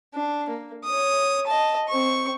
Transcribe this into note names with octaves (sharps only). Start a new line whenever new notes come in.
D4
A#3
C#5 D#6
D#5 A5
C4 C#6